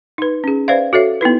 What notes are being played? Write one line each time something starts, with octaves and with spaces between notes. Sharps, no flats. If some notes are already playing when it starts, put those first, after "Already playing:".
D#4 B4
C#4 G#4
B4 C5 D5 E5 F5
F#4 A4 C#5 E5
B3 D#4 E4 B4